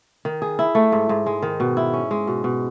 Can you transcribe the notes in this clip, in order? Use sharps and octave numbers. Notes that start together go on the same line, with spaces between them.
D#3
G#4
E4
A3
G#2
G#2
G#3
D#3
B2
E4
C#4
G#3
B2
B2